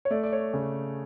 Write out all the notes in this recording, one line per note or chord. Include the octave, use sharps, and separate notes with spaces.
C#5
A3 D5
D5
C#5
C#3 G#4